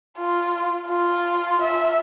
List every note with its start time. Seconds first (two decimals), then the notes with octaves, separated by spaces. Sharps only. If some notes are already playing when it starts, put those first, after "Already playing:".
0.17 F4
0.88 F4
1.62 E5